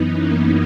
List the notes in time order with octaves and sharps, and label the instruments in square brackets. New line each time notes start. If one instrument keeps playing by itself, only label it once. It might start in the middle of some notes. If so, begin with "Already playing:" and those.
Already playing: [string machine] F#2 E3 B3 D#4
A#3 C#4